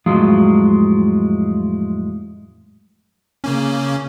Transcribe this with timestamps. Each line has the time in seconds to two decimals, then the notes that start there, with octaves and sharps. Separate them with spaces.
0.06 F2 A2 F#3 G#3 F4
3.44 C#3 A#3 C#4